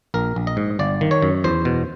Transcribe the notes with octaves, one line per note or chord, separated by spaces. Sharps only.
A#1 A#4
A#1
D#5
G#2
G1 D5
D#3
C#5
F#2
E2 C5
B2